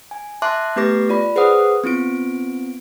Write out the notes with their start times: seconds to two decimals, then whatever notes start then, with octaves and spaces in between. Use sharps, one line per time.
0.11 G#5
0.42 E5 A5 C6 D6 F#6
0.76 A3 B3 G4 B4 D6 A#6
1.09 F4 D5 B5
1.36 G#4 B4 C5 F#5 D#6
1.84 B3 C4 F4 D7